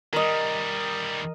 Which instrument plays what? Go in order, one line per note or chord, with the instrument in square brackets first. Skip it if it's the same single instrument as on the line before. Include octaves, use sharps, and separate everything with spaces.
[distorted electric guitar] D#3 G3 [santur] A#4 D#5